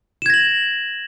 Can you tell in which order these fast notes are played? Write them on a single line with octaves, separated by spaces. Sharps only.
E7 G#6 A#6 F#7